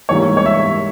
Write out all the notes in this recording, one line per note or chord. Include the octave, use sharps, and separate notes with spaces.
G#2 E3 G3 A#3 C#5
C#5
E5